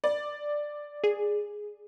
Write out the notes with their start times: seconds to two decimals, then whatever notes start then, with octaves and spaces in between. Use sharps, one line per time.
0.04 D5
1.04 G#4